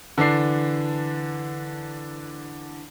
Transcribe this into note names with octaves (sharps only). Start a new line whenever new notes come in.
D3 E3 D4 C7